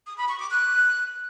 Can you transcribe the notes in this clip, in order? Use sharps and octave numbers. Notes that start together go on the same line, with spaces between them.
D#6
B5
C#6
D6
F#6